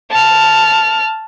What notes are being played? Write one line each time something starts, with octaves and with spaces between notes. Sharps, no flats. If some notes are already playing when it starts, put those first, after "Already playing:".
A5 F6